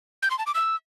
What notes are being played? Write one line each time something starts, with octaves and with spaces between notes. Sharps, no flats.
G6
C6
A5
D6
E6